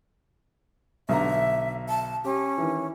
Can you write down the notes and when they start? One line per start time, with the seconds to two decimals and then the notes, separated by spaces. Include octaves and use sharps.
1.09 B1 D3 E5 A#5
1.89 A5
2.24 C#4 G4
2.58 D#3 E3